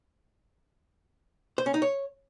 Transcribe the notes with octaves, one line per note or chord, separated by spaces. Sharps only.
C5
C#4
D#4
C#5